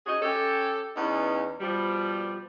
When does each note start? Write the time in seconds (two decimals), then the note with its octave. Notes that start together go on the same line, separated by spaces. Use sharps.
0.05 C#4 D#4 F#4 G#4
0.22 C#4 G4 A4
0.96 E2 B3 C#4 D#4
1.60 B2 F3 G3